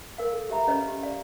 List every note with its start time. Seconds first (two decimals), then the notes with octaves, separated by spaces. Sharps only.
0.18 A#4 F5
0.33 A4
0.50 G4 E5 A#5 B5
0.67 C#4 B4 C#5 D#5 F5 B5
0.88 G4
1.03 D5 F5